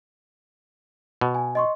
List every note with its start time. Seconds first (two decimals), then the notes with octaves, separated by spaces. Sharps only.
1.21 B2
1.35 G#5
1.55 D#5 C6 C#6